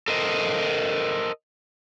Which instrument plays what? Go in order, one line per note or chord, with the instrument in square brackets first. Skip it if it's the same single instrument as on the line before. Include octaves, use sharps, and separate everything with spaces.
[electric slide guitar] A4 A#4 C5 D#5